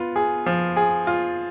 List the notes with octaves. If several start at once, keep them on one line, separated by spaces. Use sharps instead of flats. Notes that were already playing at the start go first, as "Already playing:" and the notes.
Already playing: B3 F4
G#4
F3
G#4
F4